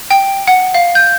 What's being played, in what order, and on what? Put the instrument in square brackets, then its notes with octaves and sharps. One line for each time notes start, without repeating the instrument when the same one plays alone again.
[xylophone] G5
F#5
F5
G6